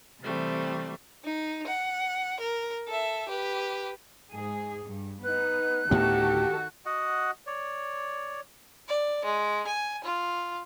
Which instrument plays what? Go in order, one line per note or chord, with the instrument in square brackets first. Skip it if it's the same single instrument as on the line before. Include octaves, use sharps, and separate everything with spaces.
[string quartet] C3 E3 G3 A3 C4
[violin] D#4
F#5
A#4
A4 E5
G4 B4
[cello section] G#2 G#4
G2
[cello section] B3 D#4 [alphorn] B4 [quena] F#6
[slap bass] D2 A2 B3 [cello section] D#3 F#4 A4 [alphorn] G4
[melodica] F#4 D#5 F#5
C#5 D5
[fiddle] D5
G#3
G#5
F4